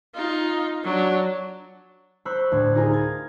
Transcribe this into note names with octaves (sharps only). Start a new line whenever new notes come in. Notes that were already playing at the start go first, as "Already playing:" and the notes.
D#4 F4
F#3 D4
C5 B5 C#6 E6 F#6
D2 A2 G#6
D#4 F4 G#4 A#4 G#5
G#6 A6